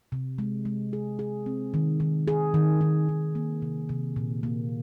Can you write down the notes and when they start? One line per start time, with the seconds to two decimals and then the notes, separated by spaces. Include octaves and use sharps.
0.12 C3
0.38 G#3
0.65 G#3
0.93 G#4
1.19 G#4
1.46 C4
1.74 D#3
2.00 D#3
2.28 G#4
2.54 D#3
2.81 D#3
3.09 D#3
3.35 A#3
3.62 C3
3.89 C3
4.16 A#2
4.43 A#3